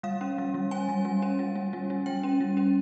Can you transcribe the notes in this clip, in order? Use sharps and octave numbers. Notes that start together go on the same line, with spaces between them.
G3 F5
C#4
G3
G3
C#4 G#5
G3
G3
C#4
G3
G3
G3
G3
G3 G5
C#4
G3
C#4